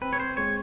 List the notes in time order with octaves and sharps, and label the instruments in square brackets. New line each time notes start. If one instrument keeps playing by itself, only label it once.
[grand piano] C4 [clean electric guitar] B4
[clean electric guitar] C#5
C5
[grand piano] G#3 [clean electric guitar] C#5